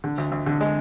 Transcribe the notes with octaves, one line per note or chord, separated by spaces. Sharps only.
D3
D2
D2
D3
G#3